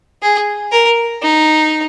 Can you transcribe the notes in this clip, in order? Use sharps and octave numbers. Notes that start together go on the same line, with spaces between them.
G#4
A#4
D#4